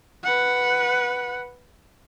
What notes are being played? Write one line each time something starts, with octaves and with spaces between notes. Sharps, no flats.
B4 F#5